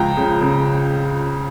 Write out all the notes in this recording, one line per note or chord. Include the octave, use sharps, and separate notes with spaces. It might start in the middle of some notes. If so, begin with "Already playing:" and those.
Already playing: C#2 F3 G5 A#5
C#3
C#3